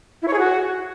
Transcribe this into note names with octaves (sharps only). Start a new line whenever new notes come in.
E4
C#5
G#4
F#4